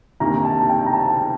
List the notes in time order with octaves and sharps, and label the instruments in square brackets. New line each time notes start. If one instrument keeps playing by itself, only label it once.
[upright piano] D2 C3 D#3 A#3 [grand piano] A#5
[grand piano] A5
G5
A#5
A5